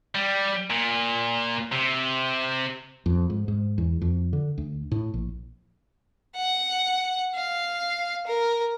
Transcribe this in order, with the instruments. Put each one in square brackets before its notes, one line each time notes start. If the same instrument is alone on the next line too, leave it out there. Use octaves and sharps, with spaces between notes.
[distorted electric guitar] G3
A#2
C3
[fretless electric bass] F2
G#2
G#2
E2
F2
D3
D2
A2
A#1
[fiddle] F#5
F5
A#4